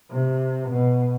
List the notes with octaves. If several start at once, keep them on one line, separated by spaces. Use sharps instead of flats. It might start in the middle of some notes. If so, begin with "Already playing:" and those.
C3
B2